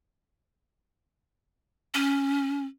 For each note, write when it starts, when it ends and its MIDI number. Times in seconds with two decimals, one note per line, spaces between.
1.94 2.66 61